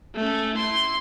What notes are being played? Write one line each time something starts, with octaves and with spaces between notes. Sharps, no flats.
A3 C#4
E4 C6